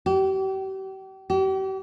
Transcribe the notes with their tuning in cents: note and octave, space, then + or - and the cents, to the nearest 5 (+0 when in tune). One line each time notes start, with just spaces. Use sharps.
G4 -40
G4 -40